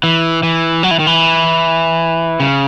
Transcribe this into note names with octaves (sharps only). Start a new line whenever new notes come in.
E3
E3
F#3
E3
D#3
E3
C#3